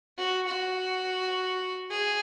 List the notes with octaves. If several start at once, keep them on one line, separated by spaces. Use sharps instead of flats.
F#4
F#4
G#4